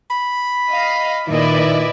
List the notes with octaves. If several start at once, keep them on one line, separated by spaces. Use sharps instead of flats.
B5
D#5 F5
A#2 D#3 E4 B4 D5 D#5